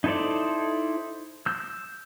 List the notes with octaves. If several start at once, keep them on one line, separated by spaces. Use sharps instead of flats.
D#4 E4 A4 C5 D5
E6 G6